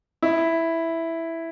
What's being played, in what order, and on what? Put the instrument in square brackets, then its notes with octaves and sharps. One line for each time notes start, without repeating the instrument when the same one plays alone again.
[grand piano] E4